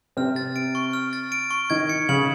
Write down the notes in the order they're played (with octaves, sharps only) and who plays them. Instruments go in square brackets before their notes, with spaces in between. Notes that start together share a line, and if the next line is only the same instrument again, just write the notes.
[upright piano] C3 C4 [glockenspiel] F6
[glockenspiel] A6
D7
C#6
F6
A6
D7
C#6
[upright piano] D#3 D#4 [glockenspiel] G#6
[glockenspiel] C#7
[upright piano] C#3 C#4 [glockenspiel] F#7